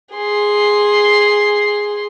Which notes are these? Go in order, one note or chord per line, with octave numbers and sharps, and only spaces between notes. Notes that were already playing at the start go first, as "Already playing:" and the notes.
G#4 C6